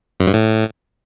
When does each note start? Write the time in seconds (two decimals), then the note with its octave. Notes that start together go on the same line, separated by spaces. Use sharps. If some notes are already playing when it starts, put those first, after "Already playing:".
0.20 F#2
0.27 G2
0.34 A2